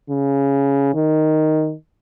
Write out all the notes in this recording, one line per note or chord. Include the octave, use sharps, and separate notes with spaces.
C#3
D#3